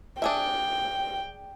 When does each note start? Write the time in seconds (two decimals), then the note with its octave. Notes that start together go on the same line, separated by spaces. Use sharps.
0.22 D4 G#4 E5 G5